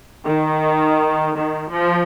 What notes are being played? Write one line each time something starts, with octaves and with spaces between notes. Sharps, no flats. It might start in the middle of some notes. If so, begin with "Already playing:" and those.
D#3
D#3
F3